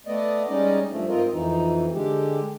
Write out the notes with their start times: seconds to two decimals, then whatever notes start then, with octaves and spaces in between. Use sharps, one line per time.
0.06 A3 B3 D5 D#5
0.48 G3 G#3 C#4 D#4 D5 D#5
0.90 G2 F3 A3
1.09 G#2 C4 F4 A#4 D#5
1.32 F2 E3 D#4
1.94 D3 G#3 G4